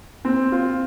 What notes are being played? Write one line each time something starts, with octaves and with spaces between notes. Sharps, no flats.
C4
F4